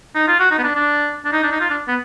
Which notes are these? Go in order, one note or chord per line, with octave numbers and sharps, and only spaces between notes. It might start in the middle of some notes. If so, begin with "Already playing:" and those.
D#4
F4
F#4
D#4
B3
D4
D4
D4
D#4
D4
D#4
F4
D4
B3